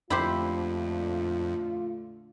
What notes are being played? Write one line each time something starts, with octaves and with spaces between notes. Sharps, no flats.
F2 A#2 D3 A3 E4 F4 G4 C5